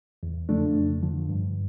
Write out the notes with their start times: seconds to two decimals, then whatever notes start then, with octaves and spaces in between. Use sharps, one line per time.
0.23 E2
0.49 C#3 F3 A3 D4
0.76 F2
1.02 D3 F3
1.29 G2